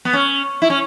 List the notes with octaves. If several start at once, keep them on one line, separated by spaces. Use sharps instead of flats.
B3
C#4
E4
C#4